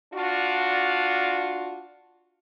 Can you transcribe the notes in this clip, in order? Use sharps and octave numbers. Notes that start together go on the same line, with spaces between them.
D4 F4 F#4